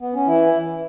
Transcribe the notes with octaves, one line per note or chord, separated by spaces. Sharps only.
B3
C#4
E3 E4